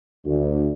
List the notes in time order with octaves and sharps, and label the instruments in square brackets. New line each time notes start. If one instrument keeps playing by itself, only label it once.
[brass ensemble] D2